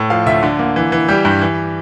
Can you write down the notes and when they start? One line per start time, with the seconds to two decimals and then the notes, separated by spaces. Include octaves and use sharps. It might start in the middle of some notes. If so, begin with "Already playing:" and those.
Already playing: A2
0.10 F3 F5
0.26 D2 E5
0.43 D3
0.59 A#3
0.76 E3
0.92 E3
1.08 G3 G4
1.25 G2
1.41 E3